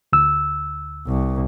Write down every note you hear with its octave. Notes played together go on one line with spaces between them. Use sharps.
D2 E6
C2